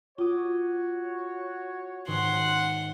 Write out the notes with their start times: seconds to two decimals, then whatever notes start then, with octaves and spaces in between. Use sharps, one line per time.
0.18 F4 F#4 C#5 D6 D#6
2.08 G#2 D#3 F#5 C6